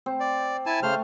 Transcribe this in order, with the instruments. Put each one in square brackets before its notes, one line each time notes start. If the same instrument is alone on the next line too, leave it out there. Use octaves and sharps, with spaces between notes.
[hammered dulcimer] C4
[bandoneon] D5
E4 G#5 A5
[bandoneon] C#3 C5 F6 [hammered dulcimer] A3